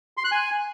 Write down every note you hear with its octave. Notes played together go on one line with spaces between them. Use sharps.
C6
F#6
G#5